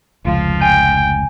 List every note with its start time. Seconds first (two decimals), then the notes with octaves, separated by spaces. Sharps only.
0.25 F1 C#2 F3 F4
0.62 G5 G#5